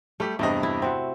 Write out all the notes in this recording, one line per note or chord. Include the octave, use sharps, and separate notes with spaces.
G3 A3 G4
E2 G2 C3 A3 D#5
E4
C4 F#4